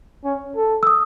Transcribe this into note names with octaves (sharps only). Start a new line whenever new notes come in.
C#4
A4
E6
D#6